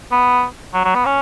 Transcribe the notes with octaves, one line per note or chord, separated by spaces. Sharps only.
B3
F#3
F#3
B3
C#4